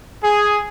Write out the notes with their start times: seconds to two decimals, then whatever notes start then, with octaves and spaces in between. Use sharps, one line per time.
0.20 G#4